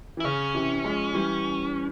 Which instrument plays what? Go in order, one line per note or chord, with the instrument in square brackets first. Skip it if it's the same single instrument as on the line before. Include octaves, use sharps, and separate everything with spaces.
[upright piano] E3
[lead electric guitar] E4
[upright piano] C#3 [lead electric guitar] C#4
[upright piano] C3 E3
F3 G#3
E3 G3